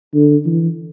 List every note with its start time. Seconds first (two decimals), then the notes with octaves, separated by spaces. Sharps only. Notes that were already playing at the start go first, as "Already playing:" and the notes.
0.14 D3
0.46 E3